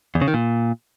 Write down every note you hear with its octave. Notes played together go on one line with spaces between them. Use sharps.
E2
C#3
D#3
A#2